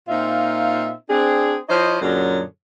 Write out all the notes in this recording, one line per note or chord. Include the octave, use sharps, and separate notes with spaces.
A#2 C4 D#4 F4 E5 F5
C4 D4 G#4
F3 E4 C5 C#5 D#5
F#2 A#2 D3 F#3 G#4 C#5